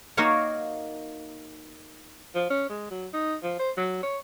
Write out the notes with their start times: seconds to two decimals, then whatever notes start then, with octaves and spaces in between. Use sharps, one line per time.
0.17 A#3 D#4 F#4 A#4 C#5 F5
2.35 F3
2.50 C#4
2.69 G#3
2.91 F#3
3.13 D#4
3.43 F3
3.60 C5
3.77 F#3
4.03 C#5